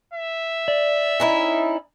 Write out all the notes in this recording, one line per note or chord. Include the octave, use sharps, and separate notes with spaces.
E5
D5
C#4 D#4 E4